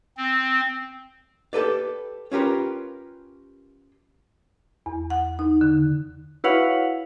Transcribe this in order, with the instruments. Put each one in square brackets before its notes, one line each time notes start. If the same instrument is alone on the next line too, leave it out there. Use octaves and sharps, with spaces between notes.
[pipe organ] C4
[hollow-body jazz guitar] G4 A4 B4 D5
C#4 F4 G4 A#4 B4
[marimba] E2
F#5
D#4
D3
[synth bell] E4 F#4 B4 C#5 F5 F#5